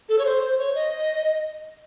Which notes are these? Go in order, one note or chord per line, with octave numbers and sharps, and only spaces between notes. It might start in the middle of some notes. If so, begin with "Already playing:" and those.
A4
C#5
C5
C5
C#5
D#5